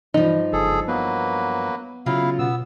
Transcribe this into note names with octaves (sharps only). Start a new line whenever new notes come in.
G2 E3 F3 D#4
F#1 G#4 A4
F#3 A#3 B3 B4
C#3 F#3 E4 F4 F5
B2 B3 E6